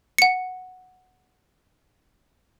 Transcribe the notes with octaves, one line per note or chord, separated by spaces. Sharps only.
F#5 C#7